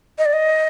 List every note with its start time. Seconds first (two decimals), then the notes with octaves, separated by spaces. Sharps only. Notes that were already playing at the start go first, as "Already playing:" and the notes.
0.18 D#5
0.25 D5
0.33 D#5